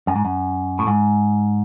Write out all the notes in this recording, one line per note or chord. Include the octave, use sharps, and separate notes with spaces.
F#2
G#2
F#2
A2
G#2